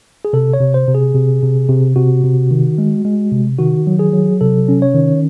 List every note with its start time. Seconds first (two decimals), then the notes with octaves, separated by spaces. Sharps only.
0.25 G#4
0.33 C3 A4
0.53 C#5
0.60 C3
0.74 C5
0.88 C3
0.95 G#4
1.15 C3
1.42 C3
1.69 C3
1.96 C3 F#4
2.24 C3
2.51 D#3
2.78 G#3
3.05 G#3
3.31 C3
3.59 D#3 F#4
3.87 F#3
3.99 G#4
4.13 F#3
4.41 C3 A4
4.69 C#4
4.82 C#5
4.94 D#3